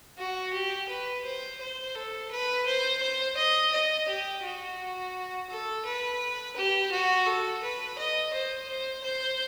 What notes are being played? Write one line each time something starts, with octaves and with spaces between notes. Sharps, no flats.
F#4
G4
B4
C5
C5
A4
B4
C5
C5
D#5
D#5
G4
F#4
A4
B4
G4
F#4
A4
B4
D#5
C5
C5
C5